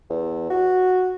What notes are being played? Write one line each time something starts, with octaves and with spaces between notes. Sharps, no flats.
E2
F#4